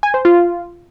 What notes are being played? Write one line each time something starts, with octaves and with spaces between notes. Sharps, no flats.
G#5
C5
F4